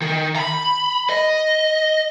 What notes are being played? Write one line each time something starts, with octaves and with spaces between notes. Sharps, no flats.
D#3
A#5 B5
D#5